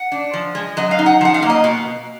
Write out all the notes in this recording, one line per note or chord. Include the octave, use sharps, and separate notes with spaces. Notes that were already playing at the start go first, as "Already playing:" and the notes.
Already playing: F#5
D4
F3
G#3
F#3 D#5
F5
D#4
F#5
F3 F#5
F5
A#3
D#5
B2